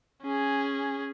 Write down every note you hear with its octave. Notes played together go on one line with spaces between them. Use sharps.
C#4 G#4